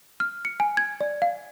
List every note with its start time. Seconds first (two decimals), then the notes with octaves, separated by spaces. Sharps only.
0.20 F6
0.45 C#7
0.60 G#5
0.77 G#6
1.01 D5
1.22 F5